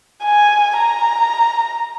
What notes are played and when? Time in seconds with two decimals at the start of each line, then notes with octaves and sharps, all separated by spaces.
0.24 G#5
0.78 A#5